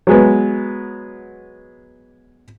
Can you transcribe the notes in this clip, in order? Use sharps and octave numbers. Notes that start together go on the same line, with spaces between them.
F#3 G#3 B3